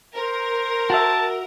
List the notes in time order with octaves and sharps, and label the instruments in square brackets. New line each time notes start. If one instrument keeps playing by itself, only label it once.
[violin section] A#4 [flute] C5
[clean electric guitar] F#4 E5 [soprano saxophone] A5